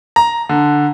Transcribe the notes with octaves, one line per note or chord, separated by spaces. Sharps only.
A#5
D3